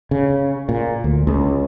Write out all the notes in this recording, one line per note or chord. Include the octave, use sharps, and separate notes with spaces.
C#3
A#2
D2
C#2